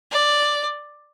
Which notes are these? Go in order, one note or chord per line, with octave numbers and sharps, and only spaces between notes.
D5